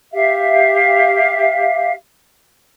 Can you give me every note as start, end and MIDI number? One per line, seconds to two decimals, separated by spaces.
0.13 1.92 67
0.13 1.92 76
0.13 1.92 77